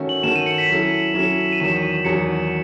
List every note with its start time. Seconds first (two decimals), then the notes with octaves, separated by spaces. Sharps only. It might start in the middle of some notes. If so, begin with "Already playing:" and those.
Already playing: D#3 A3 C#4 F#4 A4
0.09 F#7
0.23 D#3 A3 C#4 F#4 A4 E7
0.36 D#7
0.46 C#7
0.58 B6
0.69 F#3 C#4 E4 A4
1.14 F#3 C#4 E4 A4 E7
1.52 D#7
1.60 E2 D#3 F#3 E7
1.83 D#7
2.05 E2 D#3 F#3 C#7